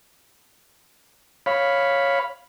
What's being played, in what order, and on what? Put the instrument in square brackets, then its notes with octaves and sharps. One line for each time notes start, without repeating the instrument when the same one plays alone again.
[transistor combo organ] C#5 F5 B5